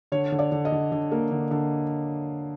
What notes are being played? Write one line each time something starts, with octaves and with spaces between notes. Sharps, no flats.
D3 C#5
D3
D5
D3
D#5
D3
D3
A#3
D3
D3